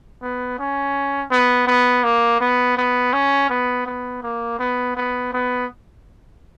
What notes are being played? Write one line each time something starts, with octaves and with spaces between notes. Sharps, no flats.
B3
C#4
B3
B3
A#3
B3
B3
C#4
B3
B3
A#3
B3
B3
B3